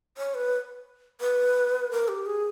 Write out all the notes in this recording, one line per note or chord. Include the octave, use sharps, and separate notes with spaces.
C#5
B4
B4
A#4
G4
G#4